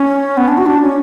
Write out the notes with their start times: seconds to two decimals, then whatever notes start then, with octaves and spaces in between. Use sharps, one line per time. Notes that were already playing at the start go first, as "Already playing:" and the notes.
Already playing: C#4
0.37 B3
0.48 D4
0.58 F#4
0.66 D4
0.81 C#4